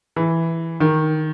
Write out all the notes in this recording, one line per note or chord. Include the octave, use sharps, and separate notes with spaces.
E3
D#3